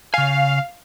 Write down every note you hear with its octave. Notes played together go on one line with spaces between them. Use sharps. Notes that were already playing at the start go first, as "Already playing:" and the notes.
C#3 F5 G#5